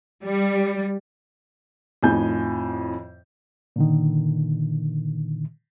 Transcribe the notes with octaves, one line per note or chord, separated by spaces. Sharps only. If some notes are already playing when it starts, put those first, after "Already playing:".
G3
F2 A2 D#3 G#5 G6
A#2 D3 D#3